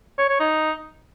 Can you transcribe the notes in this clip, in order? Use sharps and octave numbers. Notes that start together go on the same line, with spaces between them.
C#5
C#5
D#4